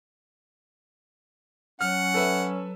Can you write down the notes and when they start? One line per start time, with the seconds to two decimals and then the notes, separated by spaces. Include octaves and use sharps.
1.81 F#3 C#4 F#5 F6
2.14 A4 B4 E5